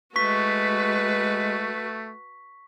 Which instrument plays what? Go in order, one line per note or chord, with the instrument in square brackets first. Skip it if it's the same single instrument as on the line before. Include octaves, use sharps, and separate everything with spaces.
[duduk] G#3 [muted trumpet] A3 [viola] F#4 B4 [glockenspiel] C#6 B6